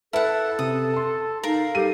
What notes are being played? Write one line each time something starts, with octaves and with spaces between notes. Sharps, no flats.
E4 A4 B4 F#5 A5 F6
C3 D#6
A5 C6
D#4 A#4 F5
G3 G4 A4 D#7